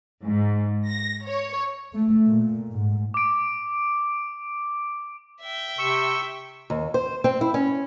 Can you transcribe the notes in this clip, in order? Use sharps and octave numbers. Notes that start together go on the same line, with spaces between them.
G#2
A#6
C#5
A3
A#2
G#2
D6 D7
E5 G5
C3 C#6 E6
D#2
C5
C4
E4
C#4